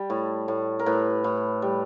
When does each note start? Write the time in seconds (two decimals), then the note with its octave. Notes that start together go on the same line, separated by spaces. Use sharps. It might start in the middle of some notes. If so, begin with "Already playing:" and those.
Already playing: G3
0.10 A2
0.48 A2
0.79 A#4
0.86 A2 B4
1.24 A2
1.62 G3